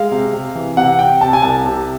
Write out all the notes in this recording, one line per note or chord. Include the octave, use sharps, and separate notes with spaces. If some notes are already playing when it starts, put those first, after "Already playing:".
Already playing: G#3 F5
C3
C3
E3
C3 F#5
C3 G5
C3 A5
G#5
C2 A5
C3